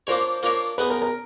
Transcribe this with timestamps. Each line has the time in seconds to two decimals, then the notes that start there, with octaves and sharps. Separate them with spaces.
0.07 A#3 D4 F4 A#4 C5 C#5
0.43 A#3 D4 F4 A#4 C#5
0.78 G#3 B3 D#4 B4
0.90 A#4
1.02 A#4